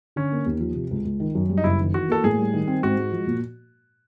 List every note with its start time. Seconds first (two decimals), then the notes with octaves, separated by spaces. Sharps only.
0.16 D3 C#4
0.32 A#3
0.46 D#2
0.60 F3
0.75 C3
0.91 C#2
1.05 C#2
1.20 D#3
1.35 F#2
1.49 G3
1.58 D#4
1.64 F#1 E4
1.79 D#3
1.94 E3 F#4
2.08 A#3 A4
2.24 A2 G#4
2.39 G3
2.53 D#3
2.68 C4
2.83 G#2 F#4
2.98 G#3
3.12 F3
3.27 A#2